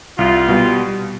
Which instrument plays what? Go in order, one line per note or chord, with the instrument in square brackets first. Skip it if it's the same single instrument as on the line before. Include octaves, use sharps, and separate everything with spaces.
[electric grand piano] C2 [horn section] F4
[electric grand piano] B2 G3